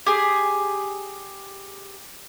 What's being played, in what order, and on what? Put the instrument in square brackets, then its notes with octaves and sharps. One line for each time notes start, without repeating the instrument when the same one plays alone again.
[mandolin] G4 G#4